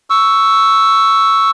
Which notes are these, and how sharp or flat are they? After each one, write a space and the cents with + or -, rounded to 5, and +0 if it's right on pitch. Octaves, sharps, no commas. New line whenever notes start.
C#6 +10 E6 +0